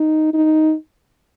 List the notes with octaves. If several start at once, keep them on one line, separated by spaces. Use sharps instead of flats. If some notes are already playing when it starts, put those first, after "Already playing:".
Already playing: D#4
D#4